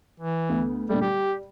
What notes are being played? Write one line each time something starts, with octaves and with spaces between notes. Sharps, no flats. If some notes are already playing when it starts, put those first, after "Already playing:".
E3
D2 B3
A#2 D3 G3 A3
G3 G4